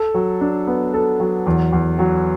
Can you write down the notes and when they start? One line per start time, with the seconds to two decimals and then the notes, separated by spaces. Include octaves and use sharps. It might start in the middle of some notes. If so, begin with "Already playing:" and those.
Already playing: A4
0.14 F#3
0.41 D4
0.67 B3
0.94 A4
1.20 F#3
1.47 E2
1.72 E2
1.99 F#3